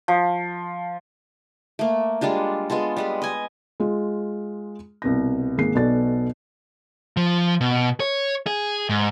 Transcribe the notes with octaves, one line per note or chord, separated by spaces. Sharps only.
F3
A3 A#3
G3 G#3 D4 F4
G#3 B3 F4 A4
G3 G#3 B4
D#5 G#5
G#3 F4 G#4
C2 B2 A#6
G#1 A#3 G#4 C7
B1 B2 F#4 A4 D5 A6
F3
B2
C#5
G#4
G#2